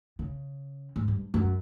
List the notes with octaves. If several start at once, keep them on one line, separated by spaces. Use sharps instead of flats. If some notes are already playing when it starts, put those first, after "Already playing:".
C#3
G#2
G2
F#2